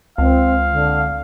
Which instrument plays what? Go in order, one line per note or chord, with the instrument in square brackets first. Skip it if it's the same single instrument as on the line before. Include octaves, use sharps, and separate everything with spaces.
[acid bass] C#2 [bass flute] C4 [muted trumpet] F5
[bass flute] D3